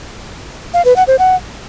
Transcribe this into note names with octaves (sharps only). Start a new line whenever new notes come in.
F5
B4
F#5
C5
F#5